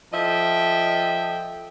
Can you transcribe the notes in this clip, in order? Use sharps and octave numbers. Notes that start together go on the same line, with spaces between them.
F3 A4 D#5 E5 G5